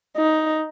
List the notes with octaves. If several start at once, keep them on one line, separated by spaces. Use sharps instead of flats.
D#4